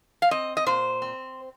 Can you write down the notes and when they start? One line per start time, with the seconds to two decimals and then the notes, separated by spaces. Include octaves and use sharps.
0.22 F5
0.31 C4 D#5
0.57 D#5
0.66 A#2 C5
1.02 C4